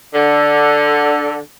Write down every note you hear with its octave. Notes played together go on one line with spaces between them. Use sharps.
D3